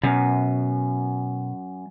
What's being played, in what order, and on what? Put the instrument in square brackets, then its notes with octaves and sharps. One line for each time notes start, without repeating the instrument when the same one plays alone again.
[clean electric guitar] F#2 [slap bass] B2